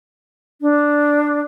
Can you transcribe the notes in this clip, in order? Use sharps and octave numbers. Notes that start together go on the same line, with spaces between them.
D4